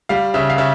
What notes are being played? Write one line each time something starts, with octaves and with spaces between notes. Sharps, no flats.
G3 F5
C#3 E5
F5
C#3 E5